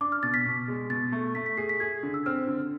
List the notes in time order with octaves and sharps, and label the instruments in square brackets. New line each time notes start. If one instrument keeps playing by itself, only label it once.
[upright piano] D4 [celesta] D6
[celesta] F6
[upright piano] B2 [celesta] A6
[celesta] B6
[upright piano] B2
G#3
[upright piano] B2 [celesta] A6
[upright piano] A3
[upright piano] A3 [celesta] B6
[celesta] B6
[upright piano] G#4 [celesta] C7
[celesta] B6
[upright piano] G#4 [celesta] G#6
[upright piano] D3
[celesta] E6
[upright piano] C4 [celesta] F6
[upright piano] D3